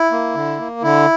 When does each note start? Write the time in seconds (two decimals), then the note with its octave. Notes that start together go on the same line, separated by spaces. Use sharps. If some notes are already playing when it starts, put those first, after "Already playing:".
Already playing: E4
0.12 A#3
0.35 D3
0.59 A#3
0.83 D3 E4